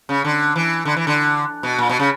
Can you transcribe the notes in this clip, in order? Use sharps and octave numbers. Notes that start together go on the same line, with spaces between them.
C#3
D3
E3
D3
E3
D3
B2
A#2
B2
C#3